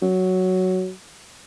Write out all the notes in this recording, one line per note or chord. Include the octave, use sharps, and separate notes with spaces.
F#3